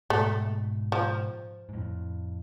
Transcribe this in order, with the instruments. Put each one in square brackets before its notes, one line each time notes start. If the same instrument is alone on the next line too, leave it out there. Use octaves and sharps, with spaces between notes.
[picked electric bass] G#2 B2 [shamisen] A3
[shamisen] F3
[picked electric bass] G#2
F2 A2